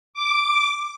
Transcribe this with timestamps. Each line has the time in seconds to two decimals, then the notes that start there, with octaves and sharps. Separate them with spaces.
0.14 D6